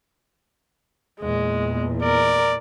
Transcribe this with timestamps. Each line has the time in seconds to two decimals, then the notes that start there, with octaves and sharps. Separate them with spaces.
1.21 E2 A#2 G#3
2.02 A#4 D5